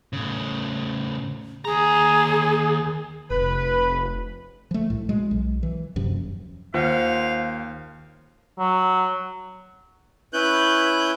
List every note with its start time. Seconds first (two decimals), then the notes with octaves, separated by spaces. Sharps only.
0.13 A2 C#3
1.65 D#2 G#4 A#5
3.30 F1 B4
4.71 F3 A3
4.90 C2 A2
5.09 B2 G#3
5.31 B1
5.63 E3
5.96 D#1 F#2 C3 F3
6.74 D#2 F4 C5 F5 F#5
8.59 F#3
10.33 C#4 E4 B4 F#6 G6